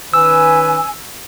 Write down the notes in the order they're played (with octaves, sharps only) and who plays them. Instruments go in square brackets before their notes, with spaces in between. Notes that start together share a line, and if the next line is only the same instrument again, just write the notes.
[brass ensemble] D#3 C#4 B4 [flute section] G#5 [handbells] E6